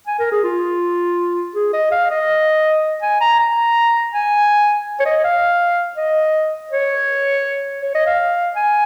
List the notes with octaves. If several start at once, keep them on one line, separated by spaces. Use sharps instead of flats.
G#5
A#4
G#4
F4
G#4
D#5
F5
D#5
G#5
A#5
A#5
G#5
C#5
D#5
F5
D#5
C#5
C#5
D#5
F5
G#5